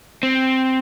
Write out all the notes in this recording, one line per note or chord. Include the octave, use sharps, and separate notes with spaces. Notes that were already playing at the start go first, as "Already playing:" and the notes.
C4